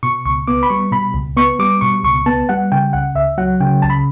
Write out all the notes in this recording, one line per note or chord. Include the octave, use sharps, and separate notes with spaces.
B2 C#6
C#2 C#6
B3 D6
B5
G3 C#6
B2 B5
C#2
B3 C#6
G3 D6
B2 C#6
C#2 C#6
B3 A5
G3 F#5
C#3 G5
C#2 F#5
C#2 E5
F#3 F#5
C#3 G5
C#2 A5
B5